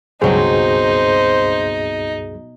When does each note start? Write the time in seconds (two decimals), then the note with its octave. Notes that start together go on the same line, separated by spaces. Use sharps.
0.22 C#2 G2 B2 F#3 C4 D#4 G#4 C5